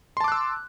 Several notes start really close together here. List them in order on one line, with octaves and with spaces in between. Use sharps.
C6 A5 D6 F#6 E6